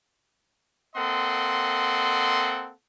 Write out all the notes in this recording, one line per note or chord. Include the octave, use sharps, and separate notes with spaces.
A#3 C4 A4 D#5 F#5 C6